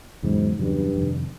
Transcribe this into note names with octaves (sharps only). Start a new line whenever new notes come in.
E2 G#2 C#3 F#3
E2 G2 C#3 F#3
F2 C3 D#3